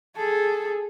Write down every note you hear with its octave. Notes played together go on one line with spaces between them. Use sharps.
G#4 A4